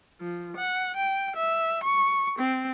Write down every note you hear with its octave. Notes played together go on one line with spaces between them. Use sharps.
F3
F#5
G5
E5
C#6
C4